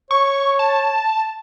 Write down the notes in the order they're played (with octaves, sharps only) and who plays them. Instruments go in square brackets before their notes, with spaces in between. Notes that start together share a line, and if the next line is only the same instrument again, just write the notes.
[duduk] C#5 [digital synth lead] C#6
[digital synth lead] A5